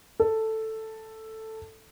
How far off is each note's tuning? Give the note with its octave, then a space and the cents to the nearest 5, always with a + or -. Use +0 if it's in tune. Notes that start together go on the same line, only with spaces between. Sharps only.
A4 +5